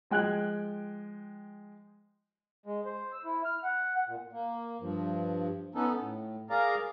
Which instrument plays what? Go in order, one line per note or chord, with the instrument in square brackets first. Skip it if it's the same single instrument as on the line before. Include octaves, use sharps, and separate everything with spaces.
[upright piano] F3 G#3 G5 F#6 G#6 F#7
[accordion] G#3
C5
E6
E4
F6
F#5
F#5
A#2
[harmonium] A#3
G2 F3
B3 C#4 D#4 A4
A2
G#4 A#4 D5 F5 A#5